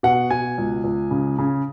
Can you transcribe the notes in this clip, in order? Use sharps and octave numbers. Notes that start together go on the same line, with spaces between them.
B2 F#5
B2 G#5
C#2
C#2
C#3
C#3